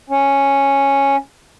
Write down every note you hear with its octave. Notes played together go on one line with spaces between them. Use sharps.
C#4